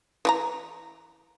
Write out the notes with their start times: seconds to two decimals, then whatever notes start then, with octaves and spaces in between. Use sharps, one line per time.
0.25 E3 F#4 A#5